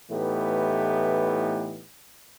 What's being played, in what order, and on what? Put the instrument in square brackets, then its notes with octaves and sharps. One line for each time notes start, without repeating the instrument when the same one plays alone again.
[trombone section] A2 E3 A3 B3 D#4 G4